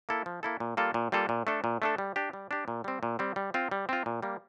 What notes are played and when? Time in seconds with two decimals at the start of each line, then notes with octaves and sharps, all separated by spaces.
0.09 A#3 E4 A4
0.26 F3
0.43 A#3 E4 A4
0.60 A#2
0.77 G3 A#3 F4 A4
0.94 A#2
1.12 G3 A#3 F4 A4
1.29 A#2
1.47 A3 D4 A4
1.64 A#2
1.82 A3 D4 A4
1.98 G3
2.16 D4 G4
2.33 G3
2.51 D4 G4
2.68 A#2
2.84 G3 C4
3.03 A#2
3.19 G3 C4
3.36 G3
3.54 C4 F4
3.71 G3
3.89 C4 F4
4.06 A#2
4.23 G3 A#3